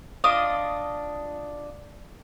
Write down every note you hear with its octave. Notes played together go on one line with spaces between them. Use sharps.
D4 F4 D#5 D#6